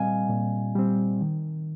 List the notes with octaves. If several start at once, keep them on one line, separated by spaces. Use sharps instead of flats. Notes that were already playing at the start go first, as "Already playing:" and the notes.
Already playing: A#2 G3 C4 D#5 F5 G#5
A#2
G3 C4
D#3